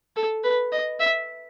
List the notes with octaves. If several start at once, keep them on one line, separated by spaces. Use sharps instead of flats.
A4
B4
D#5
E5